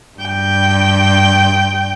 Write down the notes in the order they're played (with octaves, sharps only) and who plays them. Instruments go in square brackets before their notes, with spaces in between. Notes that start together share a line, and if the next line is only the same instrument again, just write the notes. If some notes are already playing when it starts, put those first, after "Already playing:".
[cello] G2 G5